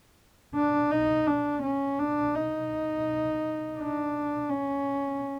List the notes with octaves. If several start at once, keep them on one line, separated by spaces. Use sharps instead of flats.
D4
D#4
D4
C#4
D4
D#4
D4
C#4